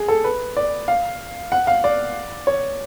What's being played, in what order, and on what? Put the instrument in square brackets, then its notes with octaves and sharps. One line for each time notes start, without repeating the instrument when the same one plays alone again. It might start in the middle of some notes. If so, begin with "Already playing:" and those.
Already playing: [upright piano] G#4
A4
B4
D5
F5
F#5
F5
D5
C#5